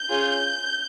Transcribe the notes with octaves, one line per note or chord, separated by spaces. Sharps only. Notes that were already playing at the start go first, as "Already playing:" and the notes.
Already playing: G6
C#4 F4 G#4